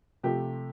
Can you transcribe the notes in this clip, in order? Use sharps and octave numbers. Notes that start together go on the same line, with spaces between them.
C3 F3 A3 G4